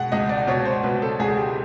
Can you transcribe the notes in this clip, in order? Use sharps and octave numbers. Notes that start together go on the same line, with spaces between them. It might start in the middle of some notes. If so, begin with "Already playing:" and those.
Already playing: B2 G#3 F#5
C#2 D#5
D5
B2 C#5
C5
B2 B4
A4
C#2 G#4
G#4
G4